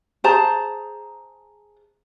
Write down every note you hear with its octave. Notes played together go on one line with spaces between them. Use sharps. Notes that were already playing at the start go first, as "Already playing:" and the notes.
G#4 C5 A5 A#5